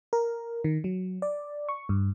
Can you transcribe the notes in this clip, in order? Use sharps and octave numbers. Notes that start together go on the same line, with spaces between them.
A#4
D#3
F#3
D5
C#6
G2